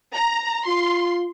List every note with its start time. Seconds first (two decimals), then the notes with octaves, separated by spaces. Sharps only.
0.15 A#5
0.67 F4 C6